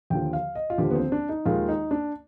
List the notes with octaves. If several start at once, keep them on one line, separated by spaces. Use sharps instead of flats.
D#2 D3 F3 G5
F5
D#5
F4
D#2 D3 F3 G4
B3
C4
D4
D#4
D#2 D#3 G#3 F4
D#4
D4